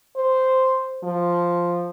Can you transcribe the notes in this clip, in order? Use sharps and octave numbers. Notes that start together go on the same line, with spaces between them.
C5
F3